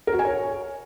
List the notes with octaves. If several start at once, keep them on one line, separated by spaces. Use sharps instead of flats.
A#4
F#4
G#5
C#5